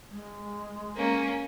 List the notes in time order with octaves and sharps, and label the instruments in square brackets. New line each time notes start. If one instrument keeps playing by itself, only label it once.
[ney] G#3
[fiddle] A#3 C#4